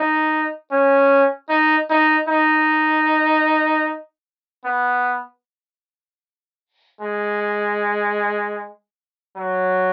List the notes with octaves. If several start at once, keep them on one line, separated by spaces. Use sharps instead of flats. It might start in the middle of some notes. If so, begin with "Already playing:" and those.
Already playing: D#4
C#4
D#4
D#4
D#4
B3
G#3
F#3